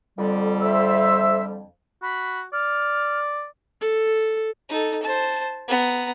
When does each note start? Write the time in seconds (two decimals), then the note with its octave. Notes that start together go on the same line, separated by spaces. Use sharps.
0.18 F2 D3 G3
0.60 C5 E5 E6
2.02 F#4 B5
2.53 D5 F6
3.81 A4
4.69 D#4 A4
5.02 C5 A5
5.68 B3 A#5